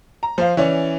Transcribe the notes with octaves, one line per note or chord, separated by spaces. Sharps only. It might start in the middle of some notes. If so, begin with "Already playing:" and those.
A#5
F3 C5 F5
E3 C#4 C#5 D5